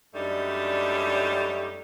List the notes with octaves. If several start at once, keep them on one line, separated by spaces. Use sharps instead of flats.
F#2 G3 A3 D4 D#4